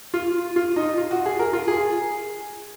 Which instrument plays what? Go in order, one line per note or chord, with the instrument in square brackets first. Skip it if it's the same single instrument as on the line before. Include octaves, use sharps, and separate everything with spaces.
[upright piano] F4
F4
D#4
F4
F#4
G#4
A#4
F4
G#4